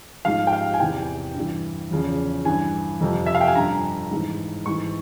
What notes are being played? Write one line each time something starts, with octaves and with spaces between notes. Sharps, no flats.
G#2 F3 F5
G5
F5
G#5
E2 C3 E3 G5
G2 E3
E2 C#3 F3
G2 E3 G#5
F2 C3 F3
E5
F5
G5
G#5
G2 F3 A#5
G#2 E3
G#2 E3 C#6